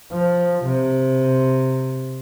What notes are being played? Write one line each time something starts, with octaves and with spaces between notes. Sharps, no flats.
F3
C3